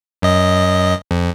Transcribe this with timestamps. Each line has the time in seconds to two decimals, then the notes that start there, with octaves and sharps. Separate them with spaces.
0.22 F#2 D#5
1.11 F2